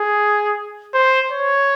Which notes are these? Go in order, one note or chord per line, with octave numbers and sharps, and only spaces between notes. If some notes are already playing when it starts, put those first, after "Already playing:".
Already playing: G#4
C5
C#5